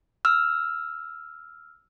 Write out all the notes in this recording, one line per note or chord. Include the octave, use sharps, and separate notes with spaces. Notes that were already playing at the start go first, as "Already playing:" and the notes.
E6 F6